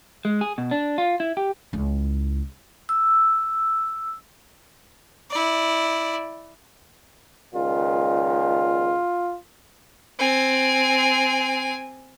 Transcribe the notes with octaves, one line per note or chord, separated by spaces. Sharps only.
G#3
G#4
B2
D4
F4
E4
G4
C#2 E4
E6
E4 D5
C#2 A#2 D#3 F4
C4 G#5